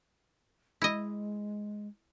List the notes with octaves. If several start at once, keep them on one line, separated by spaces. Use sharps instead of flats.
G#3 E4 D#5